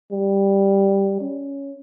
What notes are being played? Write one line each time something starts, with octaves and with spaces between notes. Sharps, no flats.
G3
C#4